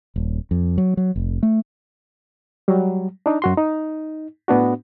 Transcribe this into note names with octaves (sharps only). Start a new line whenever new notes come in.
D#1
F2
F#3
F#3
F1
A3
F#3 G3
D4 D#4
F#2 F#4 C6
D#4
A2 B3 D4 F#4